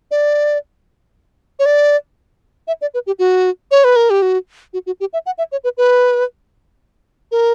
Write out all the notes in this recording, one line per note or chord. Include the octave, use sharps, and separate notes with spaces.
D5
C#5
D5
E5
D5
B4
G4
F#4
C#5
B4
A#4
G4
F#4
F#4
F#4
G4
E5
F#5
E5
C#5
B4
B4
A#4